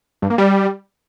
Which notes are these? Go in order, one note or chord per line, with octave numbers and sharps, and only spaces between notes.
G2
A#3
G3